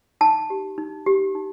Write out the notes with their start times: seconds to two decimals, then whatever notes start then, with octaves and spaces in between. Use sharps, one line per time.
0.21 D#4 A5
0.50 G4
0.78 D#4
1.06 G4
1.35 D#4